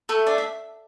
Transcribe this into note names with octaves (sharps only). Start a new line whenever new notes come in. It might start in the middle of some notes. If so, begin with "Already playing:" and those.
A3 A4
D4 D5
E5